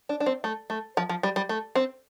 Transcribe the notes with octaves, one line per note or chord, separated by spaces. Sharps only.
D4
D4
C4
A3
A3
F3
F3
G3
G3
A3
C4